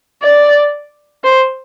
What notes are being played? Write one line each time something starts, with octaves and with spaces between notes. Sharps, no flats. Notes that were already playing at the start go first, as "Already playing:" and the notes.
D5
C5